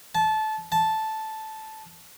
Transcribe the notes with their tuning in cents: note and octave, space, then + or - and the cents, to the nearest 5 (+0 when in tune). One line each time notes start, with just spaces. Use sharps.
A5 -20
A5 -5